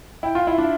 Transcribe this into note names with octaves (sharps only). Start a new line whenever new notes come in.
E4 G5
F4
F5
E4
F5
D4 E5